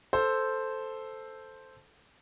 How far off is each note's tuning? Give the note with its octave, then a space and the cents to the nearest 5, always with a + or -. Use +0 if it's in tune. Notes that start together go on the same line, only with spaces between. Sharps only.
A4 +0 C5 +0